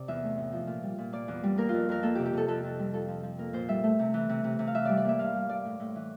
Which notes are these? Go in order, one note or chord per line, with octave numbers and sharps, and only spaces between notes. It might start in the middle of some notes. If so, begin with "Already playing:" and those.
Already playing: C3 D5
E2 E5
A3
A2
F3
A#2
G3
A#2
A#3 D5
E2
G3
A#3 A#4
F2 F4
F2 A#4
A#3 A4
C3 G4
G4
C3 A4
F2 A4
F2
G3
F3 A4
F3
F3
A#3 A#4
A#2 C5
G3 E5
A3
C3
E3
C3
C3
C3
F5
E3 E5
G3 D5
D5
A#3 E5
G2 F5
G2
G2 D5
A2
A2
E3